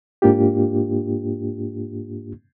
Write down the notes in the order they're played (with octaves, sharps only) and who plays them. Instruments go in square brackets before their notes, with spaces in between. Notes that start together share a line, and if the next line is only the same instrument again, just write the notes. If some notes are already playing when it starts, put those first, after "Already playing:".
[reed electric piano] G#2 A#3 D4 F4 G4